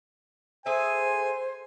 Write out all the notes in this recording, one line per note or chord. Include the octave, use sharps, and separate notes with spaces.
G#4 A4 C5 E5 G#5